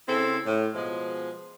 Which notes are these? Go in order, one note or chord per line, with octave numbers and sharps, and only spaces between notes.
C#3 C4 E4 A4
A2
B2 F3 G#3